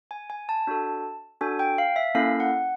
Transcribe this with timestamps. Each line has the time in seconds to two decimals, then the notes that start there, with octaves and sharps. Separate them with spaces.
0.11 G#5
0.30 G#5
0.49 A5
0.67 D4 F#4 A4
1.41 D4 F#4 A4 G#5
1.59 G5
1.78 F5
1.96 E5
2.15 A#3 C#4 E4 A4 F5
2.40 F#5